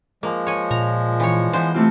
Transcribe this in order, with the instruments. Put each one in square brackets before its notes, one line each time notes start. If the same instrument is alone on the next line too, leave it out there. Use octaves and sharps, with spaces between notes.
[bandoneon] F3 G#3 [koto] A#3
[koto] C#5 G#5
[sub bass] A#2 [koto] A#5
[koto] E3 C#5
E3 B3 C5
[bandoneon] C3 [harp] A3 C4 F4